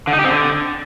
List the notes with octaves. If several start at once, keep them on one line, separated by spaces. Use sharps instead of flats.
D3
D#4
G4
C4
D3